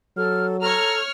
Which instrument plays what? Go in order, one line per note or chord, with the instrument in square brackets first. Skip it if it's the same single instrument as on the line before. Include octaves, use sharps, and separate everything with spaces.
[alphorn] F#3 [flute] A4 [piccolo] F6
[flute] A4 [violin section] C#5 F6 [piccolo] A#5